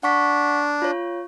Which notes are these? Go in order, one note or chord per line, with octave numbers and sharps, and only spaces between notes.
D4 F#5 C#6 B6
F4 C#5